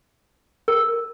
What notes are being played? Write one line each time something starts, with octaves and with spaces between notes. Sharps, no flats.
A#4